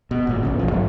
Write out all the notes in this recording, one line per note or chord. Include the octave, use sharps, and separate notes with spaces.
B2
G#1 A#2
B1 E2 C#3
B1 E2 F3
G#2 F3 F#3 A3